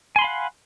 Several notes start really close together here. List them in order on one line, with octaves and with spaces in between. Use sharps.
G#5 C6 B5 F5 F#5